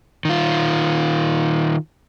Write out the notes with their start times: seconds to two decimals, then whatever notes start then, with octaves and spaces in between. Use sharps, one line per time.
0.25 D#3 F4